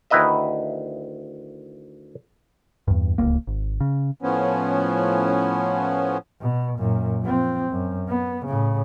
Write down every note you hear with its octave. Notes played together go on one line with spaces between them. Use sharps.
D2 D#3 E4 B4 D#5 E5
E2 G2
D1 C#2 A#3
G#1
C#3
A2 F3 B3 C#4
B2
F#2 A#2
F3 C4
F#2
B3
A2 C#3